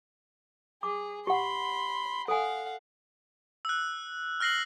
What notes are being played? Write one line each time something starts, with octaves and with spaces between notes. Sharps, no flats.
G#4 D6
G4 F#5 B5 C6
A4 F5 F#5 G#5
E6 F#6
F6 F#6 A#6 C7 F#7